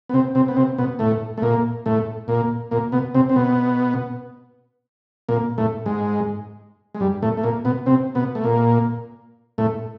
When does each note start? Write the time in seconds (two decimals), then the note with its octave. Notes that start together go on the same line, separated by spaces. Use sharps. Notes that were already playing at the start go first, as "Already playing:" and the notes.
0.09 B3
0.14 C3 C4
0.35 C3 C4
0.48 B3
0.56 C3 C4
0.78 B2 B3
0.99 A2 A3
1.38 A3
1.42 A#2 A#3
1.86 A2 A3
2.28 A#2 A#3
2.71 A#2 A#3
2.92 B2 B3
3.14 C3 C4
3.29 C4
3.36 B2 B3
5.29 A#2 A#3
5.58 A2 A3
5.86 G#2 G#3
6.94 G#3
7.00 G2 G3
7.22 A2 A3
7.37 A3
7.43 A#2 A#3
7.65 B2 B3
7.86 C3 C4
8.15 B2 B3
8.35 A3
8.44 A#2 A#3
9.58 A2 A3